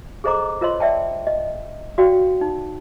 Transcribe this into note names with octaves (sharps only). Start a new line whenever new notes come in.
G#4 A4 C5 D#5 A#5 D6
F4 A#4 C5 C#5 D#5 C6
D5 E5 G5 A5
D#5
F#4 D5 F5 G5
D#4